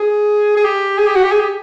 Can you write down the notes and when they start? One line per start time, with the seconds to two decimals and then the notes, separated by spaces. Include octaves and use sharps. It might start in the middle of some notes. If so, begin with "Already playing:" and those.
Already playing: G#4
0.57 G#4
0.65 G4
0.98 G#4
1.07 G4
1.15 F#4
1.23 G4
1.32 G#4
1.40 G4